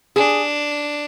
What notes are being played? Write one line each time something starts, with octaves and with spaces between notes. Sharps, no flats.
D4 G#4